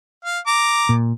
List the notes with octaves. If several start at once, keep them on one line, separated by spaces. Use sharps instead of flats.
F5
A#5 D6
A#2